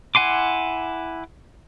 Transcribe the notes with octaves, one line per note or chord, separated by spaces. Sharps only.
E4 F#5 G#5 C6 D6